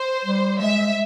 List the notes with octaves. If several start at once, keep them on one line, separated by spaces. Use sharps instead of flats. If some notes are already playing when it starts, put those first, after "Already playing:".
Already playing: C5
G3
G#3 E5